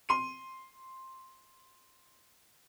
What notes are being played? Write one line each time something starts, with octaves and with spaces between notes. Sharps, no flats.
C6 D#7